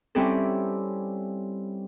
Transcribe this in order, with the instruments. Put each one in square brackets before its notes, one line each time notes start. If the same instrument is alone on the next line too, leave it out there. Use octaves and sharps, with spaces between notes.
[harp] G3 C4 C#4 E4 G4 A4